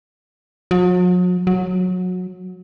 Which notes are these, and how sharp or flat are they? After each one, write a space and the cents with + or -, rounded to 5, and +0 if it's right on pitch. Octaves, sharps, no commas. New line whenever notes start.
F#3 -45
F#3 -20